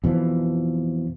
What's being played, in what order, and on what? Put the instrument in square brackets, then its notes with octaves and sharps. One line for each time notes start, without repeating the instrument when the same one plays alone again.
[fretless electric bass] F2 B2 E3 F3